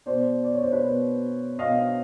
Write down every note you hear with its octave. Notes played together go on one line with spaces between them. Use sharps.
B2 C5 D5
D5
C#5
C5
B4 C#5
B2
B2 D#5 F5